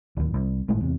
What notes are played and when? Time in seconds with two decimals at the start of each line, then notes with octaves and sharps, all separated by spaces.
0.17 D1 D#2
0.34 C2
0.68 G#1 A2 G#3 A3
0.81 E2 C3